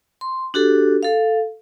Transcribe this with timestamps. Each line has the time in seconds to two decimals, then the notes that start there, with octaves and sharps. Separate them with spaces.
0.21 C6
0.54 D4 F#4 G4 A4
1.03 A4 F5